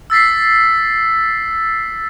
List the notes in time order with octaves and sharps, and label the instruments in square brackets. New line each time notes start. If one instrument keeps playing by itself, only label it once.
[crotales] E6 A6 B6 C7